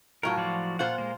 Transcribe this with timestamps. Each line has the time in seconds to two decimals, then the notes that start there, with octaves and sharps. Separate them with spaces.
0.23 A2 F#3 F4 A#4
0.37 F3 F#4 D5
0.79 A#2 F4 C5 F#5 F#6
0.98 G#3 A#3